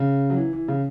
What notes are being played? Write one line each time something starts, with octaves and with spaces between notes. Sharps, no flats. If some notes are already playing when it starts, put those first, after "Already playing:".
Already playing: C#3
F#3
E3
E3
C#3